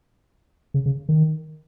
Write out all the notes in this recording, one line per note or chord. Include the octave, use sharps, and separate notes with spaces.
C#3
C#3
D#3